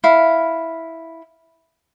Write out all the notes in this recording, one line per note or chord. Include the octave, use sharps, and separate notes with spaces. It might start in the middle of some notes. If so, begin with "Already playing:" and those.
E4 F5